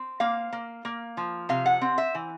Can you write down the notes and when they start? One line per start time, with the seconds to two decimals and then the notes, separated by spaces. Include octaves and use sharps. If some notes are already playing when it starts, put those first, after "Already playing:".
Already playing: C4
0.20 A#3 F5
0.53 A#3
0.85 A#3
1.17 F3
1.49 C3 F5
1.66 F#5
1.81 C4
1.98 E5
2.15 E3